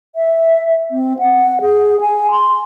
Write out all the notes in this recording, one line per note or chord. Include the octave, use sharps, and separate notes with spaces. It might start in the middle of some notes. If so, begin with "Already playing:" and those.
E5
C4
F#5
G#4
G#5
C6